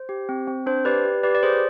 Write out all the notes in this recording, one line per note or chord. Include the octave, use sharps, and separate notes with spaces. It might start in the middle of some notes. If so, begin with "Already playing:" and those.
Already playing: C5
G4
C4
C4
D4 C5
G4 B4 D5
G4
G4 B4 D5
D5
G#4 C5